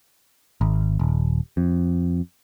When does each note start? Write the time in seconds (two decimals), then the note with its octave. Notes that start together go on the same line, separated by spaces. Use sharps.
0.61 G#1
0.99 D#1
1.57 F2